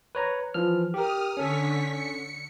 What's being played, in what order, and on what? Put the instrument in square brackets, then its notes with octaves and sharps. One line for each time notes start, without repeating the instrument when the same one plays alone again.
[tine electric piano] B4 C#5 A#5
E3 F3 F6
[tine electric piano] G4 A#4 [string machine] D#6 F6
[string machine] D3 C#6 B6 [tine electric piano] C#4 A4
[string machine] C#7